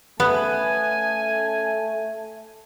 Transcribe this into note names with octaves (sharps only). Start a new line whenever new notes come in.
A3 B3 C#4 G#5